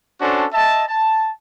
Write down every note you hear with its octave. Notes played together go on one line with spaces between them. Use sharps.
C#4 D4 F#4 A4 C5
D#5 E5 A5
A5